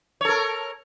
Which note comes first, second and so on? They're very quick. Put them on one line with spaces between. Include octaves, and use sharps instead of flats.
C#5 A4 A#4